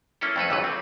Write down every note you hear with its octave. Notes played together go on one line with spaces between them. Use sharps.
A#3 C#4 E4 A4
F2 A3 A4 B4
C#2 D3 F#3 B4
C4